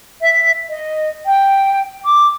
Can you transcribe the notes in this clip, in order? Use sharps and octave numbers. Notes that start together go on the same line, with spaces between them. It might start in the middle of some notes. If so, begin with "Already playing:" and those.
E5
D#5
G5
D6